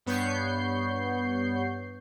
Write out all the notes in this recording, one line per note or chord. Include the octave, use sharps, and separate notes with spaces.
G2 B3 C#5 C#6 G6 C7